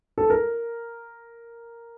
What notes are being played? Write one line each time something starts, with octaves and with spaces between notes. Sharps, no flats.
A4
A#4